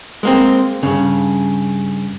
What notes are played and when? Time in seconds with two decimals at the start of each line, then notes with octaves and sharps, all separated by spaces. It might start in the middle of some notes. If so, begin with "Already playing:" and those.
0.23 G#3 A#3 C4
0.83 G2 A#2 C#3